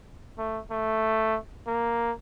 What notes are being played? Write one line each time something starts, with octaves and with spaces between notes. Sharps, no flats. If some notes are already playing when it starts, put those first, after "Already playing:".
A3
A3
A#3